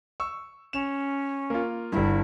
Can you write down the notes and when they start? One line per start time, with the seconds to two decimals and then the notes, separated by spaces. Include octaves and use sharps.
0.20 C#6 E6
0.73 C#4 E7 F7
1.50 A#3 F4
1.92 G1 G2 E4